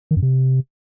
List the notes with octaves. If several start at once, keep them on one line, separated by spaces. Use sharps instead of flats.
D#3
F#2
C3